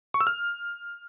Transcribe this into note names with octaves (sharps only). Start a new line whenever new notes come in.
C#6
E6
F6